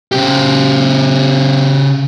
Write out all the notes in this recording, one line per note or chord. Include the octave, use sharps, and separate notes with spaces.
C#3 G4